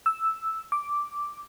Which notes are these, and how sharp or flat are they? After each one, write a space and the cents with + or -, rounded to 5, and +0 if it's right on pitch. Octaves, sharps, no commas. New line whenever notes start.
E6 -5
D6 -5